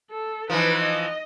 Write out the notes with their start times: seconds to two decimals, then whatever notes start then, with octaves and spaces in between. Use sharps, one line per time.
0.11 A4
0.50 E3 F3 D#4 B4
0.82 D#5